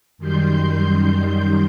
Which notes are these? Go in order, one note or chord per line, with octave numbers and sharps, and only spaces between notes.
F#2 D#3 G3 C6 G6